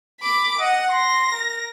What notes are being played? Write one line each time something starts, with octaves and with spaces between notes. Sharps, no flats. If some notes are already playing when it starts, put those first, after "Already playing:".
B5 D6
D#5 F#5
C6 A#6
A#4